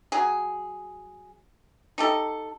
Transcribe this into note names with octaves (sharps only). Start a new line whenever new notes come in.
F#3 G#4
D#4 G4 A4